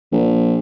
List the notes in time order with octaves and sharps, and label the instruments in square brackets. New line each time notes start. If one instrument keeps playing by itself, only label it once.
[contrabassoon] A#1